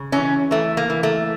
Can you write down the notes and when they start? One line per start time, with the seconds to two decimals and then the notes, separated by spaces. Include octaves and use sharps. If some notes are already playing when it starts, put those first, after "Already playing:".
Already playing: C#3
0.12 E3 C#4
0.51 E3 A3
0.77 A#3
0.90 E3
1.03 A3